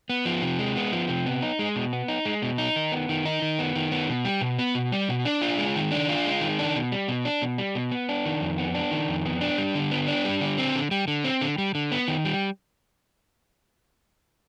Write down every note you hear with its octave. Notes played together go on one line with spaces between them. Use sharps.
B3
F3
C3
G#3
B3
F3
C3
B3
D#4
G#3
B2
B3
D#4
G#3
B2
D#4
D#3
B3
D#3
D#4
D#3
B3
D#3
B3
B2
G3
B2
B3
B2
G3
B2
D4
F4
G#3
D#3
D4
F4
G#3
D#3
D4
B2
G3
B2
D4
B2
G3
B2
B3
D4
D#3
F2
B3
D4
D#3
F2
B3
D4
G3
D3
B3
D4
G3
D3
C4
D3
G3
D3
C4
D3
G3
D3
B3
D#3
G3